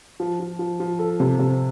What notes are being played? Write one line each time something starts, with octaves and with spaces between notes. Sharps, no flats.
F3
F3
F3
F3
A4
C3
C3